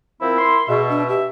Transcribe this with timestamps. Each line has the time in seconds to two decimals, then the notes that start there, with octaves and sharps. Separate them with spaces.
0.22 F3 C4 E4 A#4
0.39 C6
0.68 B2 G#4 E5
0.89 D4
1.09 G4 E5